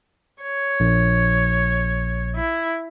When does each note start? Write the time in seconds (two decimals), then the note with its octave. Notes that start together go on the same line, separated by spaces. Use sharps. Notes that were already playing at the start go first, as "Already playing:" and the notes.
0.43 C#5
0.80 A#1
2.36 E4